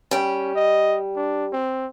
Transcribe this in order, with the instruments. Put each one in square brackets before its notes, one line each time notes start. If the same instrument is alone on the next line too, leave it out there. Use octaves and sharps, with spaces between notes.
[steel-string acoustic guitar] G3 G5 [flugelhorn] C#4
[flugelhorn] D#5
D4
C4